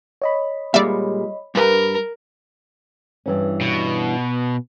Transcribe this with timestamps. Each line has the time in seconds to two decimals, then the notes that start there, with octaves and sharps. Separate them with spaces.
0.22 C#5 D#5 B5
0.74 A#2 G3 G#3 D5 E5
1.55 G2 A#4 B4
3.26 G2 E3 C#4
3.61 B2